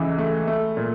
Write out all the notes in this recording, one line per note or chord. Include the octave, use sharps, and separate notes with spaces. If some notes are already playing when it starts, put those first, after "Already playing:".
Already playing: C#2 E3 A3 C#4
A3
A3
A#2